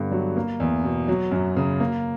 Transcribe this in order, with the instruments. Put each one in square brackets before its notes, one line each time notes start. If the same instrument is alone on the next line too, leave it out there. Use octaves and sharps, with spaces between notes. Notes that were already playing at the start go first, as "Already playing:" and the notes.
Already playing: [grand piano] G2 D3 B3
F#3
A#3
E2
B2
F#3
F#2
C#3
A#3